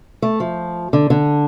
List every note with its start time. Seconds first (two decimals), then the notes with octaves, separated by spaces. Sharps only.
0.22 A3
0.40 F3
0.93 D3
1.10 D3